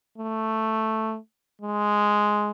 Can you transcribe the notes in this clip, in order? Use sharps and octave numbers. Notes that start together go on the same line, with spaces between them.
A3
G#3